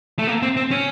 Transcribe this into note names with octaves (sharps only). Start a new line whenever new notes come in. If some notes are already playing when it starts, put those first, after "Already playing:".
A3
A#3
C4
C4
C#4